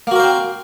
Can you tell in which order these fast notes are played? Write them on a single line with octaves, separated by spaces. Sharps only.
A#3 F#4 A#4 C5 C4